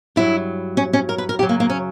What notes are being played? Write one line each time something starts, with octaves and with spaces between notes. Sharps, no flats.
G2 F#3 E4
C#4
C#4
A#4
B4
A#4
F#2 C#3 F#3 G4
A#3
A#3
C#4